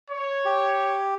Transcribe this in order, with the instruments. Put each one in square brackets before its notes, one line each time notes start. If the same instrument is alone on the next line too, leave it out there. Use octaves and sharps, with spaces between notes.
[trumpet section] C#5
[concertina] G4